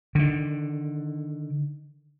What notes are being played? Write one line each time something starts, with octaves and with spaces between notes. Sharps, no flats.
D3 D#3